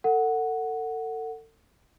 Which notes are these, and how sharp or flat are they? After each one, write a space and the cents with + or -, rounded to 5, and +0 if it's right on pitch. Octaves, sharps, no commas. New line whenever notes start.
A4 +35 F#5 +0